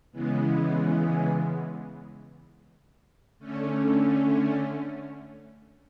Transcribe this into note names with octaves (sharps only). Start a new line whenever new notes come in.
C#3 E3 G#3 B3
D3 A3 C#4